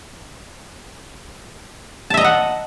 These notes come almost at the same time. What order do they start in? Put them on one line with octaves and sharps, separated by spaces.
A5 E5 D#5 A#5 F#5